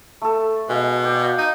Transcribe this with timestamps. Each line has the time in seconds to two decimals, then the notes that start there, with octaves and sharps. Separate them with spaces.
0.22 A3 A4
0.69 B2 G#3 F5
1.04 D5 G5
1.38 D#4